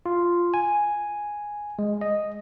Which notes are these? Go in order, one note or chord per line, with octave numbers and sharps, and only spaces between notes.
F4
G#5
G#3
D#5